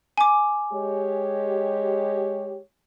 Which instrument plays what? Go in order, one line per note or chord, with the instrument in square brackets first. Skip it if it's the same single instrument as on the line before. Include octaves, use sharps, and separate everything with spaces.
[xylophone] G#5 D6
[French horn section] G#3 G4 C#5